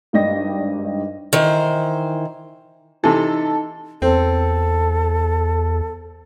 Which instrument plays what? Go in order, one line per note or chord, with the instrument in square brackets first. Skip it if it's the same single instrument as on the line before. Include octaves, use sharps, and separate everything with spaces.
[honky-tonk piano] G#1 G2 D4 D#5 G5 A#6
[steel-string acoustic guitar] D#3 E3 C5
[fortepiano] C3 E3 [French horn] D#4 [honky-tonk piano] A4
[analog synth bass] E2 [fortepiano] C4 [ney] A4